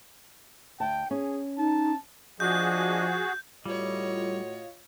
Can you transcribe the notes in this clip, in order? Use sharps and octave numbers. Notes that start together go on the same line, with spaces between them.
D2 G5 A5
C#4 G#4
D#4 A5
F3 D4 F#4 G#4 D#5 G6
A2 G3 F4 F#4 C#5 D#5